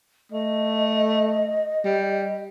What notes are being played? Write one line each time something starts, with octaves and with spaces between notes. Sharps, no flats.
A3 D#5
G3